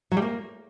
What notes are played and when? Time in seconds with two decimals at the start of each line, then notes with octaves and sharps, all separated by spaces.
0.12 F#3
0.17 G3
0.22 A#3